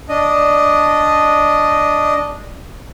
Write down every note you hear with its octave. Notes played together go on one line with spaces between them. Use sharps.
D4 D#5